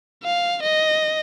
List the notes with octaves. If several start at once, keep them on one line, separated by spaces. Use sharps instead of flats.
F5
D#5